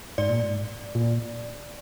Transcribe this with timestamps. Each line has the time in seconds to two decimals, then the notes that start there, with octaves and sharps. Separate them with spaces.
0.18 G#2 D5
0.29 A#2
0.41 G#2
0.95 A#2